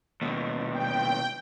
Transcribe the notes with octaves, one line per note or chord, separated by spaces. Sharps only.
D#2 B2
G5